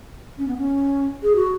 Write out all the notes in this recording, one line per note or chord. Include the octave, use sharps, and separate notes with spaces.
C#4
B3
C#4
G#4
F#4